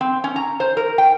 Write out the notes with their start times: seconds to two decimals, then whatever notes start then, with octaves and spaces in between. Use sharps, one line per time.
0.01 C4
0.24 C#4
0.36 A#5
0.60 C5
0.77 A#4
0.98 G5